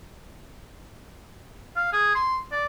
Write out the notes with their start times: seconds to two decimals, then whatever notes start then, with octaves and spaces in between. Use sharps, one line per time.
1.76 F5
1.93 G#4
2.15 C6
2.51 D5